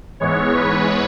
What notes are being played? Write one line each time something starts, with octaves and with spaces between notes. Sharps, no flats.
G#2 E3 G#3 B3 C#5
B4